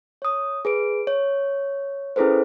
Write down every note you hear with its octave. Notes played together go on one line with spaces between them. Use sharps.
C#5 D#6
G#4 B4 D7
C#5
C#4 E4 G#4 A4 B4 C5